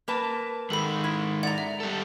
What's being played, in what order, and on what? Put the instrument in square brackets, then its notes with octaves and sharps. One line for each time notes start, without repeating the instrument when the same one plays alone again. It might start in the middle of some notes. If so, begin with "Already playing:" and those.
[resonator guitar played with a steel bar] A#3 B4 A5
[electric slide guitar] D#3 G#3 [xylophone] A4 B5
[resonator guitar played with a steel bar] E4
[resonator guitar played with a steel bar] D5 A#5 [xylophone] F#5
[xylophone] E5
[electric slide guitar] G3 A4